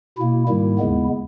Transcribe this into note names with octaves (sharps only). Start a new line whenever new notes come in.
B2 A#3 E4
G#2 D#3 G3 A#3 E4
D#2 C#3 G#3 B3